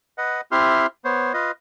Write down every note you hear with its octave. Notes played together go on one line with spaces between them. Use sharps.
B4 D#5 F#5
C4 E4 G4 E5 C6 F6
B3 C5 C#5
F4 B4 D#5